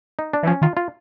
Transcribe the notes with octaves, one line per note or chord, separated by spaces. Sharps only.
D#4
D4
E3
F3 C#4
D#3 F4
F4